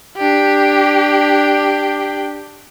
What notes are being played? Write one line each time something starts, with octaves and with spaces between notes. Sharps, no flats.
D4 G4